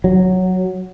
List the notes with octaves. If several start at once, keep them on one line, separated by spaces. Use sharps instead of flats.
F#3